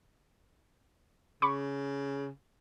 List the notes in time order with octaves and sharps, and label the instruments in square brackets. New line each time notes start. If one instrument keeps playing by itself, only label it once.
[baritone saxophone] C#3 [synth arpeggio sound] B5 C#6 D6